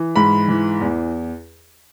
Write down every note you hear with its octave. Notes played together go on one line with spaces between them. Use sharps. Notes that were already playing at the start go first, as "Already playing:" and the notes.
Already playing: E3
G#2 B5
E3
E2